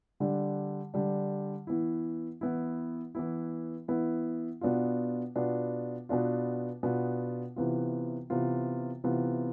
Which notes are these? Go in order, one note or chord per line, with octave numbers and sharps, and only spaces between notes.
D3 G3 D4
D3 G3 D4
E3 B3 E4
E3 B3 E4
E3 B3 E4
E3 B3 E4
B2 B3 D4 F4
B2 B3 D4 F4
B2 B3 D4 F4
B2 B3 D4 F4
C3 E3 B3 F4
C3 E3 B3 F4
C3 E3 B3 F4